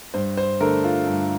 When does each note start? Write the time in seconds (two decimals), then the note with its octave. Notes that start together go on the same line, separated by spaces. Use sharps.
0.14 G2 C5
0.37 C5
0.61 D3 A3 A#4
0.84 F4
1.07 G2